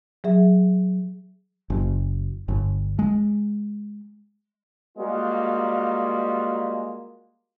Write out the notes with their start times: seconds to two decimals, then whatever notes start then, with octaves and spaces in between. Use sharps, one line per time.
0.24 F#3 G#4 E5
1.70 F#1
2.48 G1
2.99 G#3
4.98 G3 G#3 A#3 F4 F#4